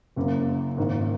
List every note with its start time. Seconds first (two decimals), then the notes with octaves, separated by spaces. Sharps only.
0.16 F#1 F#2 C#3 A#3
0.77 G#1 G#2 D#3 A#3 D#4